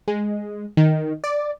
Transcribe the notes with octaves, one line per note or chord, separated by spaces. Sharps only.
G#3
D#3
D5